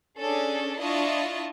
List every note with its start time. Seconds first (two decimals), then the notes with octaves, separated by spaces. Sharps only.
0.19 C#4 D4 G#4 A4
0.79 D4 E4 F4 D#5 A5 C#6